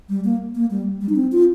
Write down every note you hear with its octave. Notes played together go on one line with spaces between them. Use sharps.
G3
A#3
A#3
G3
G3
D#4
C4
F4